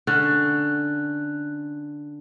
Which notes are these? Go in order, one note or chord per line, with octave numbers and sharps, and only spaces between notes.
D3 C#4 F#6